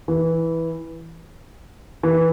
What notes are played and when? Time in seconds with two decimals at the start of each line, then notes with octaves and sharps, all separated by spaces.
0.08 E3
2.03 E3